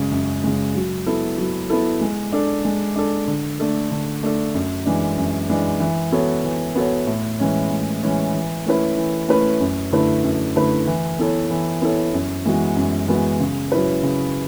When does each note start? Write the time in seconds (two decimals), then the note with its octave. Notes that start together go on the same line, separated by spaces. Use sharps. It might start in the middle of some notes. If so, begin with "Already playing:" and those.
Already playing: F#2 C#3 G#3
0.12 F#2
0.44 C#3 G#3
0.75 F#3
1.06 B3 E4 A4
1.38 F#3
1.70 B3 E4 A4
2.01 G#3
2.33 D4 A4
2.65 G#3
2.96 D4 A4
3.28 D3
3.59 A3 D4 A4
3.91 D3
4.23 A3 D4 A4
4.55 F#2
4.86 E3 G#3 D4
5.18 F#2
5.50 E3 G#3 D4
5.80 E3
6.12 B3 F#4 A4 C#5
6.44 E3
6.75 B3 F#4 A4 C#5
7.07 A2
7.39 E3 G#3 C#4
7.70 A2
8.03 E3 G#3 C#4
8.33 E3
8.66 A3 C#4 E4 B4
8.97 E3
9.28 A3 C#4 E4 B4
9.61 F#2
9.92 D3 A3 E4 B4
10.24 F#2
10.56 D3 A3 E4 B4
10.87 E3
11.19 B3 E4 A4 C#5
11.51 E3
11.82 B3 E4 A4 C#5
12.14 F#2
12.45 E3 G#3 B3 F#4
12.76 F#2
13.08 E3 G#3 B3 F#4
13.40 C#3
13.72 F#3 C#4 E4 B4
14.03 C#3